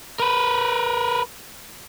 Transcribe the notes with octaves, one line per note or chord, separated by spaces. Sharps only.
A#4 B4